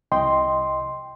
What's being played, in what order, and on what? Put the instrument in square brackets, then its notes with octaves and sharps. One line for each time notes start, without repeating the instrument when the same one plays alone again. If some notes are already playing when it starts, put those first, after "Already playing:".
[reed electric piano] C2 D#5 G5 C6